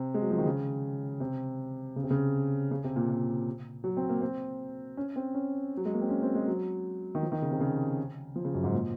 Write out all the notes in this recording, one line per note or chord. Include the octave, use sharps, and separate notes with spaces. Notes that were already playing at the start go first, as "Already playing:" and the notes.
Already playing: C3
G#3
F#3
F3
D#3
C#3
C3
C#3
C3
C#3
C#3
C3
A#2
A#2
F#3
C4
A#3
C4
C#4
C4
C#4
F#3
G#3
A#3
C4
C#4
C4
G#3
F#3
D#3
F3
D#3
C#3
C3
C#3
F3
C#3
F#2
G#2
A#2